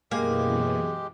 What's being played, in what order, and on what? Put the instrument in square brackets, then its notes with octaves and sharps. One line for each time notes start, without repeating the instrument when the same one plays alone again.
[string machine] F#2 B2 E3 [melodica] G#3 G4 [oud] A#3 [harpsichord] G#4